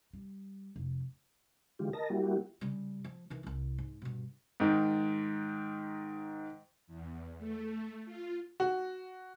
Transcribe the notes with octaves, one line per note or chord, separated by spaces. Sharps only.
G3
F1
D3 E3 G#3 F4 G4
A#4 D#5 A5 A#6
G3 A#3 E4 F#4 G4
C#3 G3
F3
D#3 E3
C2 E4
G#2
G2 B2
G#2 D#3
E2
A3
F4
F#4